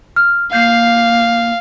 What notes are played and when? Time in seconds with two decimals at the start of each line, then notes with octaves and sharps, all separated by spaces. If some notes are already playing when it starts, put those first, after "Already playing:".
0.16 F6
0.53 A#3 F5 G6 C7